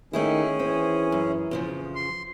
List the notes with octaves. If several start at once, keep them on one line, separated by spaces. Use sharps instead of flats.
D#3 A3 C#4 D#4 E4 G#4
E3 C4
F#2
F2 C#3 F3
C6